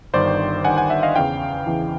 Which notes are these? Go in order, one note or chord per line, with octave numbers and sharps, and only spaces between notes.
G1 G2 D#3 C5 D5
G1 G2 D#3 F#5 G#5
F#5 G#5
E5 F#5
D#5 F5
E2 C#3 E3 F5 G5
E2 C#3 E3